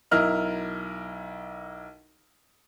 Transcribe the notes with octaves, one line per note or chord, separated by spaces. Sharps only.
B1 E4 A#4 D#5 F6